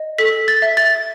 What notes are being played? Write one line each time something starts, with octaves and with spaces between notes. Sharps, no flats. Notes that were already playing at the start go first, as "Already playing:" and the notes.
Already playing: D#5
A4 B6
A6
E5
A6